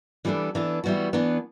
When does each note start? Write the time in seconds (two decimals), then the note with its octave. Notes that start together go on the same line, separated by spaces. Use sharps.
0.25 E3 G3 B3 D4 A4
0.55 E3 B3 D4 A4
0.84 E3 G3 B3 F#4
1.13 E3 B3 D4